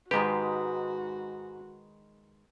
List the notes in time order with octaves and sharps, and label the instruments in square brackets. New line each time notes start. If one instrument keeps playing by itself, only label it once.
[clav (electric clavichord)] G#2 G4 [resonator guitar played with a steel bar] D#3 G#3 B4 [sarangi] F#4